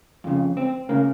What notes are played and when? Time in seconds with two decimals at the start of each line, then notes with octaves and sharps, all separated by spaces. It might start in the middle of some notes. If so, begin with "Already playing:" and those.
0.24 F2 C#3
0.57 C4
0.89 C#3 A#3